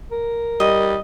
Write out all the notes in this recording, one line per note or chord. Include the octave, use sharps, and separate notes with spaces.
A#4
G3 D#5